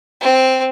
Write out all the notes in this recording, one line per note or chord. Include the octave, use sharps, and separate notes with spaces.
C4